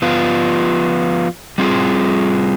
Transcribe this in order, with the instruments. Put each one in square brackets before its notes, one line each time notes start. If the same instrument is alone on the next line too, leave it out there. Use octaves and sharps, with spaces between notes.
[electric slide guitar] F3 B3 F4
G3 C4 F4 G#4